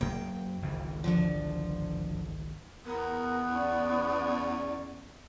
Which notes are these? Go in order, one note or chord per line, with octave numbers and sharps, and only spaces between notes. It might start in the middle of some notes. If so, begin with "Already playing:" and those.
F#2 A#3 G5
G#1 C#2 E3
G2 D3 F3
E2 B3 A#4
C#4 D5